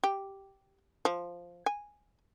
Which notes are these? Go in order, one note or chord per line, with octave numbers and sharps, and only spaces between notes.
G4
F3
G#5